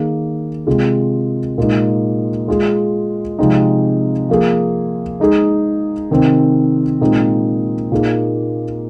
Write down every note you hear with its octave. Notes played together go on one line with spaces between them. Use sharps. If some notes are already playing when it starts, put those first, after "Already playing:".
Already playing: D#3 A#3 G#4
C3 G#3 F4 G#4
A#2 G#3 D#4
G#3 F4 G#4
C3 F3 G#3 C4 D#4
F3 A#3 G#4
G#3 D#4 G#4
C3 D#3 C4 D#4
A#2 G#3 C4 D#4
A#2 A#3 D#4 G#4